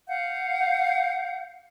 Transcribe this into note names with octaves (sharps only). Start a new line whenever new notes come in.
F5 F#5 G6